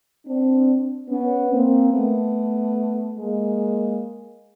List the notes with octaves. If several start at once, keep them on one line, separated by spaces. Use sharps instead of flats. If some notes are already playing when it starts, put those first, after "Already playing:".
C4 D4
B3 C#4
A#3 C4
A3 B3
G#3 A#3